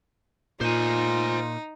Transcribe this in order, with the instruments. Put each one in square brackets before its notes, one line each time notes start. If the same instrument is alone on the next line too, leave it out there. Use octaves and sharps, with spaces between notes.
[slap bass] A#2 [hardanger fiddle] D#4 [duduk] F4 [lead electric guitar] C5 G#5